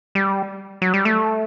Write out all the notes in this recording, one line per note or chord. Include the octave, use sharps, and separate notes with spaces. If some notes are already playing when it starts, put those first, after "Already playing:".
G3
F#3
G3
A3